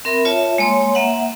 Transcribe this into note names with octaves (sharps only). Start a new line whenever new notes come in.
C4 A#4 E5 B5
F4 C#5 E5 A5
G#3 A#3 C#5 C6
A#3 E5 F#5